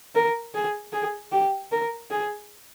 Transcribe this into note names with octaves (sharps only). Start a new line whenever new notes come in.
A#4
G#4
G#4
G4
A#4
G#4